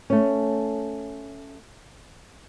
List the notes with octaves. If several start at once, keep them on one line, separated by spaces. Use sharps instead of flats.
A3 C#4